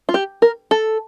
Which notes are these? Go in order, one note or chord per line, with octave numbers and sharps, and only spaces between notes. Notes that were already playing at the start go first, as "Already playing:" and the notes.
F4
G4
A#4
A4